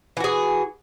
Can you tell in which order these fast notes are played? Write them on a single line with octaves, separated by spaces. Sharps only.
E3 F#4 G#4